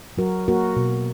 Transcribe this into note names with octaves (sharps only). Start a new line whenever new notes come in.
F#3 F#4 A#4
A#3 F#4 A#4
B2